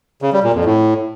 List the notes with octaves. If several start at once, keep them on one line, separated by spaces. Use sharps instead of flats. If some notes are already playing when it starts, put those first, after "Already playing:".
C#3
G3
A#2
F2
A2